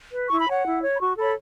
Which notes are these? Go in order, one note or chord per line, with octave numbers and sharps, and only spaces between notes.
B4
E4 C#6
B5
C#5
F#5
E4
C#5
B5
F#4 C#6
A4 C#5 B5